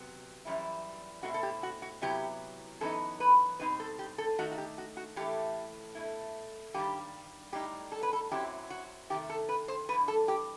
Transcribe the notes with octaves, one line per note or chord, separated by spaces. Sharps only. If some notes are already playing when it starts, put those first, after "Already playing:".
Already playing: C3 F#3 B3
F#2 E3 G3 E4
B2 A3 C4 E4 F#4
A4
G4
F#4
F#4
C3 F#3 B3 E4 G4
F#2 E3 B3 D#4 A4
B4
B2 G3 C4 D#4 B4
A4
G4
A4
D#3 A3 D#4 F#4
F#4
G4
F#4
F#4
A2 E3 A3 G4
B2 A3 E4
G2 D#3 G3 G4
A2 G3 D#4 G4
A4
B4
A4
F#2 F#3 C4 E4 G4
F#4
C3 D#3 A3 G4
A4
B4
C5
G2 E3 G3 B4
A4
G4